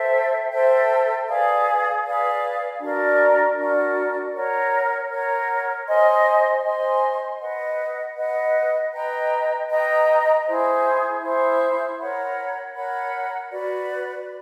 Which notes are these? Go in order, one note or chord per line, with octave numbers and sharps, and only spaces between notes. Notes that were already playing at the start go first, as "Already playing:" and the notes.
Already playing: A4 C5 E5 G5
A4 C5 E5 G5
G#4 B4 D5 F5
G#4 B4 D5 F5
D4 F#4 A#4 D5
D4 F#4 A#4 D5
A#4 C#5 F#5
A#4 C#5 F#5
C5 D#5 G#5 C6
C5 D#5 G#5 C6
B4 D#5 F#5
B4 D#5 F#5
B4 D#5 G5 A#5
B4 D#5 G5 A#5
E4 G#4 C5
E4 G#4 C5
A#4 C#5 F#5 B5
A#4 C#5 F#5 B5
F#4 B4 D5